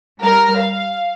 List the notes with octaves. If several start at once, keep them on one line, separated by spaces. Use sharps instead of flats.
G3 A#4 F6
F5